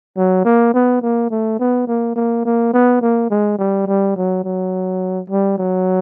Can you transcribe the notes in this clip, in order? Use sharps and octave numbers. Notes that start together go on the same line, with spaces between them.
F#3
A#3
B3
A#3
A3
B3
A#3
A#3
A#3
B3
A#3
G#3
G3
G3
F#3
F#3
G3
F#3